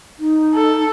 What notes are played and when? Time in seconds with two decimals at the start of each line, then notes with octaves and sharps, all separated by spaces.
0.19 D#4
0.53 A4